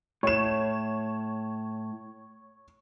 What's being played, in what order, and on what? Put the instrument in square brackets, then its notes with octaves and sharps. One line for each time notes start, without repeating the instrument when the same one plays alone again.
[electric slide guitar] A2 [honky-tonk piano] C#5 E7